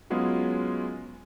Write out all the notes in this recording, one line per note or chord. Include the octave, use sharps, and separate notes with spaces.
F#3 G#3 B3 C#4 F4 G#4